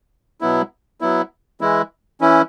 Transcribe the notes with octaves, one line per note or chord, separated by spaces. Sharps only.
B2 F#3 B3 E4
F#3 B3 E4
E3 G#3 E4
E3 C#4 E4